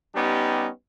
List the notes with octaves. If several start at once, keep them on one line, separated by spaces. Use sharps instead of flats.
G3 B3 C#4 D#4 G4